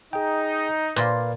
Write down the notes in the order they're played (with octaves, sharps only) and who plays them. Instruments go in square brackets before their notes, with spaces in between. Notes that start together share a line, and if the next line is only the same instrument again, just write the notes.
[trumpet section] D#4 [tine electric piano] G#4 G5
[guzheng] A#2 [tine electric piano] B4 D5 F5